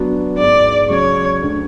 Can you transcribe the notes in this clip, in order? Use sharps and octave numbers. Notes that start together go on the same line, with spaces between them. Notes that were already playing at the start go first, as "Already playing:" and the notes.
Already playing: F#3 B3 D4 F#4
G#2 G#3 B3 D5
C#3 F#3 C#4 C#5
D2 D3 F#3